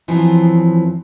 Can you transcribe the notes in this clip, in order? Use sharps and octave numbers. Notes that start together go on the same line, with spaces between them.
F#2 E3 F3 C4